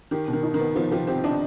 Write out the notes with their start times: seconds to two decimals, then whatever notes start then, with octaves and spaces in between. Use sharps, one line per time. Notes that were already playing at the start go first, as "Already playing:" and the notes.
0.11 D#3 G4
0.28 B2
0.33 D#3
0.43 D#4
0.54 D#3
0.60 B3
0.76 F3 B3
0.91 F3 G4
1.07 C4 G4
1.24 D4 D#4